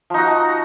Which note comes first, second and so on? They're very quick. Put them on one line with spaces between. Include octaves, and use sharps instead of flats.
F3 D#4 F#4